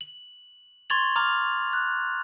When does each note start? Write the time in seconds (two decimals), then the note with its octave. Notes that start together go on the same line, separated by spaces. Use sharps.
0.01 F#7
0.90 C6 C#6 G#6 A6 F7 F#7
1.16 A#5 D6 F6 F7
1.73 F#6